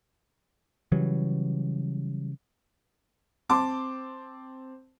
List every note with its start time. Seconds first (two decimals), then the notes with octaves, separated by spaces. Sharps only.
0.92 C#3 E3 F#3 G3
3.49 C4 A5 C6 D6